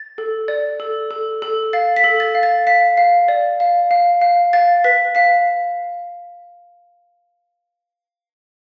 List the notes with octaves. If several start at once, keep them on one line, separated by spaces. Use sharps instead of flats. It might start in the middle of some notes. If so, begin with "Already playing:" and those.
Already playing: A6
A4
D5
A4
A4
A4
F5 A6
B6
A4
A6
F5
A6
F5 B6
F5
D5
F5
F5
F5
F5 A6
B4 B6
F5 B6